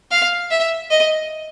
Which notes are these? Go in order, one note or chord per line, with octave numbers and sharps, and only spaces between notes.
F5
E5
D#5